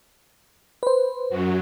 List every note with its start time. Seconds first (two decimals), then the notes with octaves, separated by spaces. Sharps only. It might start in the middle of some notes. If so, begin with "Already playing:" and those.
0.83 B4 C5
1.29 F#2 F#3